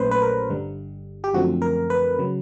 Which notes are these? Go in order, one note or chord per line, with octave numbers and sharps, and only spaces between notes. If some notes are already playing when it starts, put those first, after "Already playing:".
Already playing: A#1 A#2 F#3 A3 C#4 B4 C5
B4
A#4
G1 G2 D3 G3
G4
F#2 D3 F3 A3 C4 F#4
A#4
B4
C#3 F#3